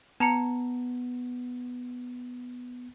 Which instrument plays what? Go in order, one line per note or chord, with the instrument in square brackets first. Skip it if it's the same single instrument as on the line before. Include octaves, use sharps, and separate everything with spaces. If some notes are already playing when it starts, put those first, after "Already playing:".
[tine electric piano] B3 [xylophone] A5 A#5 C#7